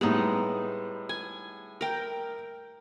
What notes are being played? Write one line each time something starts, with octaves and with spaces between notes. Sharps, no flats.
A2 G3 G#3 B3 D#4
G#5
A#4 G5